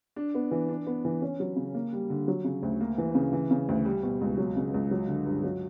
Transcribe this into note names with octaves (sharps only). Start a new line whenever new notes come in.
D4
B3
E3
D4
B3
E3
C#4
F#3
C#3
A#3
G3
D3
F#3
C#3
D2
A#3
E3
C#3
E3
C#3
D2
G3
B2
C#2
F#3
C#3
C#2
F#3
D3
G2
F#3